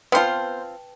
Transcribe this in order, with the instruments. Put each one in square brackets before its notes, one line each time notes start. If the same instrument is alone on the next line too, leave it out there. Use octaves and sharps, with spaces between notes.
[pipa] B3 C5 [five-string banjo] C4 F4 [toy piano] B4 G5 A5